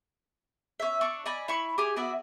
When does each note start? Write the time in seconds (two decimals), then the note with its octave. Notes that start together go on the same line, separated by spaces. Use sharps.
0.80 C#4 E5
1.01 D4 C#6
1.26 D5 D#5 G#5 B5
1.48 E4 B5 C#6
1.78 G4 G#4 G#5
1.96 B3 F#4 D5 E5